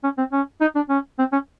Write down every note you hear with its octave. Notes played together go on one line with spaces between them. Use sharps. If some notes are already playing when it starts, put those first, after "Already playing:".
C#4
C4
C#4
D#4
D4
C#4
C4
C#4